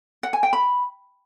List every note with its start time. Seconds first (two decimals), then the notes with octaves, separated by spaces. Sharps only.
0.23 F#5
0.33 G#5
0.43 G5
0.53 B5